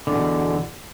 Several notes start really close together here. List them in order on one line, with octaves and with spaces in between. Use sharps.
D3 E2 B2